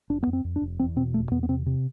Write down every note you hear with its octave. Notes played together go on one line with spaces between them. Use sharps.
F1 D4
F2 B3
C4
F2
D4
F1
E2 C4
B2 C4
F1 A3
E2 B3
B3
C3 C4
C3